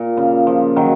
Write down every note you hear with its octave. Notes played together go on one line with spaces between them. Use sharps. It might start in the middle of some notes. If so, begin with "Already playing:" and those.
Already playing: A#2
C#3
F3
D#3 F#3